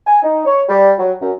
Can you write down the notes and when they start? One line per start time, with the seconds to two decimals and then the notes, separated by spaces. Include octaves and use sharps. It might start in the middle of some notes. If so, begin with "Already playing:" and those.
0.07 G#5
0.23 D#4
0.46 C#5
0.69 G3
0.98 F#3
1.21 F#2